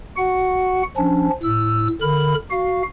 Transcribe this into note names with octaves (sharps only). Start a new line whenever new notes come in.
F#4 F#5
F3 C#4 D4
A2 E6
D3 A#4 B5
F#4 F5